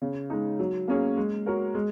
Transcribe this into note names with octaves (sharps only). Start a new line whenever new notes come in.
C#3
G#3 D#4
F#3
A#3 C#4 G#4
G#3
F#4 A#4 C#5
G#3